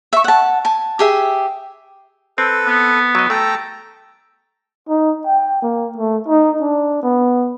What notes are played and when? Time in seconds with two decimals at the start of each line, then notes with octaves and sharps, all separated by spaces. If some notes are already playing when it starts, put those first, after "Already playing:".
0.13 E5 C#6
0.24 F#5 A5
0.65 G#5 A5
0.99 G4 G#4 E5
2.38 C4 A4 B4
2.66 B3
3.15 F#3 D#5
3.30 A3 A4 G5 A#5
4.89 D#4
5.27 G5
5.62 A#3
5.97 A3
6.28 D#4
6.61 D4
7.03 B3